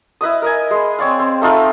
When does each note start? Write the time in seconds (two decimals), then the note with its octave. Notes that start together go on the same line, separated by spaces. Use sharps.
0.21 E4 B4 D#5 D#6
0.42 A#4 D#5 G#5
0.71 G#3 B5
0.98 C4 C#5 D5 F5
1.20 C4
1.42 A3 D#4 F4